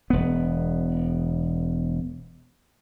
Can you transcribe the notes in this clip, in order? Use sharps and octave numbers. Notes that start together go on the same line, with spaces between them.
E1 B3